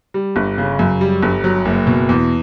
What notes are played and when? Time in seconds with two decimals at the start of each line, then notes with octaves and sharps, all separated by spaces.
0.14 G3
0.36 G1
0.58 C#3
0.79 F#2
1.01 G3
1.23 G1
1.44 F#3
1.65 F#1
1.87 B2
2.09 E2